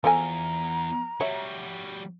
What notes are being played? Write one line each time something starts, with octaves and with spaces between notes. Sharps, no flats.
E2 F3 A4 G#5 A#5
G3 F#4 C#5 E5